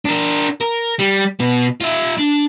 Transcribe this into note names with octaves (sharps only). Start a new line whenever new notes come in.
D4 A#4
A#4
G3
B2 B3
F4 E5
D4